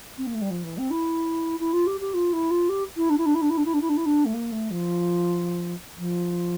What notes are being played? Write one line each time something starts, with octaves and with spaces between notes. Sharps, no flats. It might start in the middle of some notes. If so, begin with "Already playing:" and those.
C4
A#3
A3
G3
F3
E3
C4
E4
E4
F4
G4
G4
F4
E4
F4
G4
E4
D4
E4
D4
E4
D4
E4
D4
E4
D4
E4
D4
E4
D4
A3
A#3
A3
F3
F3